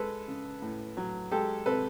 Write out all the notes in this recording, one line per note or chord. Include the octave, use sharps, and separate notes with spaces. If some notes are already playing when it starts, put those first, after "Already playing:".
Already playing: G#3 A4 B4
C#3
A2
F#3
G#3 G4 A4
C3 A4 B4